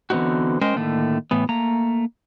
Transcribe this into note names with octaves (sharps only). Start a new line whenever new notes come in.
D3 E3 B3 C4 D#4 F#4
G#3 C#4 A#4 C5 D#5 G5
A2 D3 D#3 A3 A#3
A2 E3 B3
A3 A#3 A#5